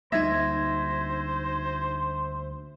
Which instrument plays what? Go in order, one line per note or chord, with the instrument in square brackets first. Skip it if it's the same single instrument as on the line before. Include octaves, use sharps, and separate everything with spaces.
[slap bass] D2 G3 A#3 [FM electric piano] D#4 G#6 A#6 [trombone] C5 [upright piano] E5